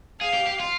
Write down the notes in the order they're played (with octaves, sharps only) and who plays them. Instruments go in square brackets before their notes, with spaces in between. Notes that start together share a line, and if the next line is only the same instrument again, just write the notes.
[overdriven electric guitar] G#4 [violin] F5
[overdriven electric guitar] G4
G4
F4